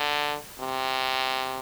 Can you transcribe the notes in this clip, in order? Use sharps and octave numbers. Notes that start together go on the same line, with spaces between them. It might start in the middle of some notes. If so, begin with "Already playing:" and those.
Already playing: D3
C3